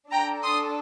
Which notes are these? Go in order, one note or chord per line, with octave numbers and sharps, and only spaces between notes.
D4 A4 G5 A#5
C6 D#6